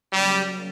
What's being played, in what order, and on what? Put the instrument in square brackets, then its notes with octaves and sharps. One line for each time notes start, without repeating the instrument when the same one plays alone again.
[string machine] C#3 F#3 A#3 C#4 [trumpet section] G3